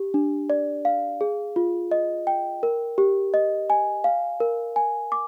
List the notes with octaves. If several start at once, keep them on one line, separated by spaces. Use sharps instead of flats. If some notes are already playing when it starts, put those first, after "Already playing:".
Already playing: G4
D4
D5
F5
G#4
F4
D#5
G5
A#4
G4
D#5
G#5
F5
A#4
G#5
D6